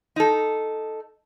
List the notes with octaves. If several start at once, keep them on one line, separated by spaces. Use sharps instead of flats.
D#4 A4